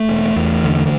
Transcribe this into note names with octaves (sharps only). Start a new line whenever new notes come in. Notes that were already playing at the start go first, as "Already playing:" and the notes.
Already playing: A3
E1
E2
D3